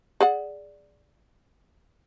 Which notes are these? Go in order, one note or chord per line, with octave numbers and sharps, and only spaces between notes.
G#4 D5 F#5